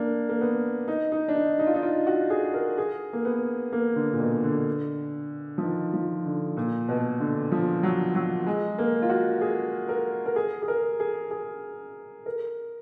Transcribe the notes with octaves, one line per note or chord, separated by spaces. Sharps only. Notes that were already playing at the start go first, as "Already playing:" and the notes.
Already playing: A#3 D4
A#3
B3
D#4
D#4
D4
D#4
D#4
F4
D#4
F4
F#4
G#4
A#4
G#4
A#3
B3
A#3
D3
A#2
B2
D3
F3
D#3
F3
D3
A#2
B2
D3
F3
F#3
F#3
G#3
A#3
F4
F#4
G#4
A#4
A#4
G#4
G#4
A#4
G#4
G#4
A#4